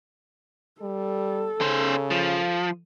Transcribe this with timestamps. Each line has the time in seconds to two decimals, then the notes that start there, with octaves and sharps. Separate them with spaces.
0.81 G3 A4
1.61 C#3 C#4 C5
2.11 F3